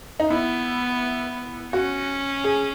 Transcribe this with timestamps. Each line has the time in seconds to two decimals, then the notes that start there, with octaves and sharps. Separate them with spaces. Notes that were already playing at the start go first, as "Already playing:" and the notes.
0.20 D#4
0.30 B3 E4
1.72 C#4 F#4
2.44 G#4